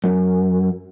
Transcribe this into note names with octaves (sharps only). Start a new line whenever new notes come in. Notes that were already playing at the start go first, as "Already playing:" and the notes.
F#2